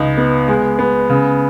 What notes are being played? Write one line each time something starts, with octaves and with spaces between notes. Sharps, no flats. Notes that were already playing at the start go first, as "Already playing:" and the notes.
Already playing: C#2 D#4
B3
G#3
B3
C#3